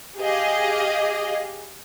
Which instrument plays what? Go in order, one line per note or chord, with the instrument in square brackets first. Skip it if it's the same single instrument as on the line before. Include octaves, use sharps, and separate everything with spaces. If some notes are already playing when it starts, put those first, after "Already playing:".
[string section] G4 G#4 D#5 F5